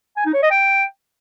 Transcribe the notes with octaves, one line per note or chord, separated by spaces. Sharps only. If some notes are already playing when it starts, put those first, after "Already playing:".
G#5
D#4
C#5
D#5
G5